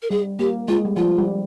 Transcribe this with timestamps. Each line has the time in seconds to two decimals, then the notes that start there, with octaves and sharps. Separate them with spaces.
0.02 A#4
0.10 G3 G#4
0.39 A#3 G4
0.68 G#3 F4
0.85 G3
0.96 F3 F4
1.18 G3